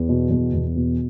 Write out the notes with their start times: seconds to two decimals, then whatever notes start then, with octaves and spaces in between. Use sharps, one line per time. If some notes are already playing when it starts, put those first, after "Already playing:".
Already playing: E2
0.09 B2
0.30 E2
0.53 E2
0.76 B2